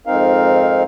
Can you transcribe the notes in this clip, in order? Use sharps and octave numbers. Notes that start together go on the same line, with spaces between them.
F2 G#2 C4 D#4 A#4 F5